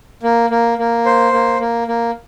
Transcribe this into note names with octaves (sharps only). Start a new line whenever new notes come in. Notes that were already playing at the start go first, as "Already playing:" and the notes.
A#3
A#3
A#3
C5
A#3
A#3
A#3